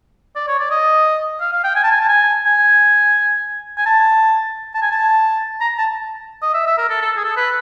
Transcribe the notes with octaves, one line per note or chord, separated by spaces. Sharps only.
D5
C#5
D5
D#5
F5
F5
G5
G#5
A5
G#5
A5
G#5
G#5
G#5
A5
A5
G#5
A5
A#5
A5
D#5
E5
E5
A#4
A4
A4
G#4
A4
B4